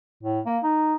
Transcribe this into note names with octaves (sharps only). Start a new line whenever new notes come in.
A2
A#3
D#4